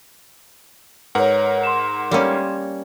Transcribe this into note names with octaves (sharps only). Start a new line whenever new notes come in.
G#2 A#4 B4 C#5 F#5
C6 E7
G3 A#3 C#4